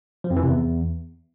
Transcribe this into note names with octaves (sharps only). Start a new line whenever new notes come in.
F3
F2
E3
C3
E2